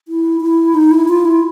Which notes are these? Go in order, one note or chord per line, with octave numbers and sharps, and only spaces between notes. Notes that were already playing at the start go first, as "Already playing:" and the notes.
E4
E4
D#4
E4
F4
E4